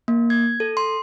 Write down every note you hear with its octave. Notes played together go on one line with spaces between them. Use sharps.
A#3
G#6
A4
C6